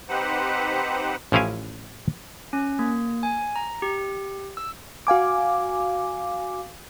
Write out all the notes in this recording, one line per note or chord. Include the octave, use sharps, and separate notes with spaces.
C4 D#4 G4 B4 C5 F#5
A1 F3 C#4 E4 F5 G#5
C#4
A#3
G#5
A#5
G4
E6
F#4 F5 G#5 D6